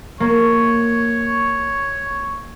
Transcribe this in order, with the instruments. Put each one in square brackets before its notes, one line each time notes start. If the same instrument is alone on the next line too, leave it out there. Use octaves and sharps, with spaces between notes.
[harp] A#3 [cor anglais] C#5